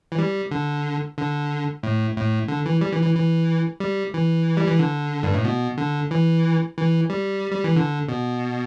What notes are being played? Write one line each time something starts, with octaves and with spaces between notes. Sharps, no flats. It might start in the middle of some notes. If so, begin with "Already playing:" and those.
E3
G3
D3
D3
A2
A2
D3
E3
G3
E3
E3
E3
G3
E3
G3
E3
D3
G2
A2
B2
D3
E3
E3
G3
G3
E3
D3
B2